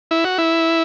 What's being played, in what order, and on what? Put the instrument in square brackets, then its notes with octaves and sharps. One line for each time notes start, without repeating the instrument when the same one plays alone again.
[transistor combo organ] E4
F#4
E4